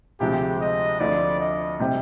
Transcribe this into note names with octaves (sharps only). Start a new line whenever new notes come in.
D2 C3 F3 G#3 C4 G4
D#5
D2 D3 F3 D5
D#5
C3 G3 C4 G4 C5